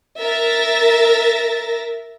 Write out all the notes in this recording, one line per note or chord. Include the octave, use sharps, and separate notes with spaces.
A#4 E5 A6 A#6